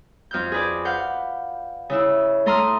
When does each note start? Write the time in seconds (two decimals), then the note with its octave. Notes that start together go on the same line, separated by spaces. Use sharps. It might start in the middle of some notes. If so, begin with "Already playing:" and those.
0.31 F2 F6 G6
0.52 G#4 B4 D5
0.85 B4 F5 F#5 G6
1.90 C#3 E4 E6
2.46 A3 A4 A#5 C6 D#6 F6